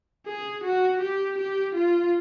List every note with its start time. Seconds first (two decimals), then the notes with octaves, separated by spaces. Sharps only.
0.27 G#4
0.64 F#4
1.01 G4
1.38 G4
1.75 F4